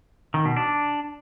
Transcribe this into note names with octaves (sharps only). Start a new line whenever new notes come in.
D#3
B2
D4